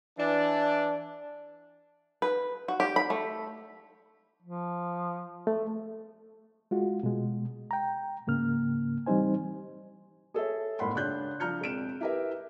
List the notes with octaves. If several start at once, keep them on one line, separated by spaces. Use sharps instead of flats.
E3 D4
B4
F#4
G4
B5
A3
F3
A3
G#3 F4 F#4
B2 G#3
G5 A#5
G#2 C#3 A#3 F6
E3 G3 C4 D#4 C5 G#5
G#4 A4 C#5 E5
G#1 A2 A#3 F#5 B5 C6
C#2 D4 C#5 F#6 G6
F3 D4 A#5 F6 G6 C#7
E1 C4 D7 E7
E4 G4 A#4 B4 E5